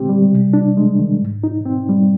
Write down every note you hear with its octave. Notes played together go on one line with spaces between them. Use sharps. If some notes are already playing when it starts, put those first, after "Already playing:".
Already playing: A#2 D3 G#3 C4 G4
G3
C3
D4
G#3
D#3
G#2
D#4
C4
G3